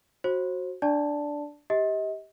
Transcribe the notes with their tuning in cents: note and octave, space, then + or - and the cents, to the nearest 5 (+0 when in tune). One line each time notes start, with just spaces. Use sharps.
F#4 -5 C5 +30
D4 +0 D5 -5 A5 +0
G4 +0 D#5 +35